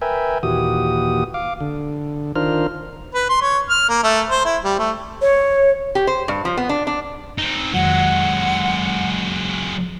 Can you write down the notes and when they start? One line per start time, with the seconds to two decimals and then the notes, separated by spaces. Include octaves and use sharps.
0.02 A#4 B4 E5 G5 G#5
0.43 D#2 A#2 E3 F#4 G4 D#6
1.34 F5 D6
1.60 D3
2.36 D#3 D4 F4 A#4 C5 F6
3.15 B4
3.29 C6
3.41 C#5
3.70 F6
3.89 A#3
4.03 A3
4.29 C5
4.45 E4
4.64 G3
4.79 A3
5.22 C#5
5.95 G4
6.07 C5
6.28 G2
6.45 F3
6.57 B3
6.69 D4
6.87 D4
7.38 C4 D#4
7.74 F2 D#3 F#3 G#3 F#5